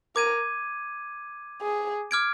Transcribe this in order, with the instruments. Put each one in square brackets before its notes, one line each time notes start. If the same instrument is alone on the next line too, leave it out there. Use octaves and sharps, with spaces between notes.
[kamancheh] A#4 [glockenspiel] D6 G#6 D#7
[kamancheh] G#4
[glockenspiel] D6 F6 G#6 D7